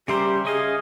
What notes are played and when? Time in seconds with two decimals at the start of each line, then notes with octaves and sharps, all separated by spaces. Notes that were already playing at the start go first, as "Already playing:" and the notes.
0.08 C#3 G3 G4 A#4 C5 E5 C6
0.45 C#4 G#4 D#5 F5